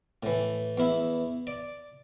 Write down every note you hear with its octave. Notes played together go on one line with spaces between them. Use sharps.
A2 E3
E2 E4
D5